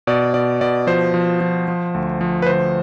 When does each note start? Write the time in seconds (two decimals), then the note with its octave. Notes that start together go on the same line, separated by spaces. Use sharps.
0.07 B2 D5
0.34 B2 D5
0.61 B2 D5
0.87 F3 C5
1.14 F3
1.41 F3
1.68 F3
1.94 D2
2.21 F3
2.42 B4
2.47 D2 C5